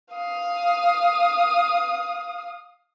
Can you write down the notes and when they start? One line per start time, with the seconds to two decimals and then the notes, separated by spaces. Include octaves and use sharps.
0.13 F5 D#6